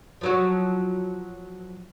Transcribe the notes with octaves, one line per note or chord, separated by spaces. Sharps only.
F3 F#3 F#4